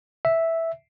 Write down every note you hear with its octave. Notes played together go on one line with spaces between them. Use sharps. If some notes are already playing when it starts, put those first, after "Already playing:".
E5